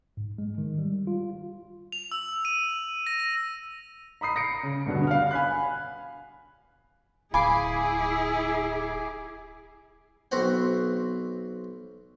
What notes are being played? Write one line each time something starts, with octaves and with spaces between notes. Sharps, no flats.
G#2
G#3
D#3
G3
F4
F7
E6
D#7
A#6
A#6
A#5 B5 D#6 C7
A#6 C#7 D7
C#3
G2 B2 D3 B3
F5 F#5 F6
G#5 B5 F#6
D1 E4 G#4 F5 G#5 B5 D6 C7
B1 C4 F#4 B4 C5 F#5